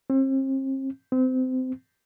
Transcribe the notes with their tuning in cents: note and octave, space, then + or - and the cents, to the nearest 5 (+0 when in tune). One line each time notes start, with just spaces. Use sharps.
C4 +40
C4 -25